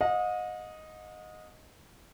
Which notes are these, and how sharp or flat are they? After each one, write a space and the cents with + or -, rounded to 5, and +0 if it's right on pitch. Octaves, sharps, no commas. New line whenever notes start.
D#5 +0 F#5 -45